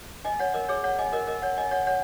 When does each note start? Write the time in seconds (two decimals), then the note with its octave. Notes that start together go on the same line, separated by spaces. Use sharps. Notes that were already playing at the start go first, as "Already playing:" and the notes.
0.25 D#5 G#5
0.39 C#5 F#5
0.54 A#4 D#5
0.69 G#4 C#5
0.84 C#5 F#5
0.99 D#5 G#5
1.13 A#4 D#5
1.27 A#4 D#5
1.42 C#5 F#5
1.58 D#5 G#5
1.71 C#5 F#5
1.87 C#5 F#5